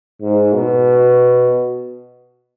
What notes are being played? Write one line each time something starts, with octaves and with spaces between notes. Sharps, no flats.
G#2
B2